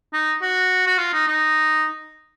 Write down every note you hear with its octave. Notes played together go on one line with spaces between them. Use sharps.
D#4
F#4
F#4
F4
D#4
D#4